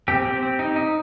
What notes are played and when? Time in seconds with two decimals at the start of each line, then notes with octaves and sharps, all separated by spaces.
0.08 C4 G4
0.25 C4
0.42 C4
0.59 D#4
0.76 D#4